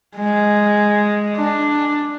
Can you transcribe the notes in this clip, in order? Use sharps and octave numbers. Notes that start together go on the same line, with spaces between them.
G#3
D4